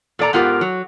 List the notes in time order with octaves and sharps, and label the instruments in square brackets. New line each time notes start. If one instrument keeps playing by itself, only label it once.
[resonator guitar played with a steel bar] A#2 A4 D5 A#5
G#2 B3 F4 G4 A#4
F#3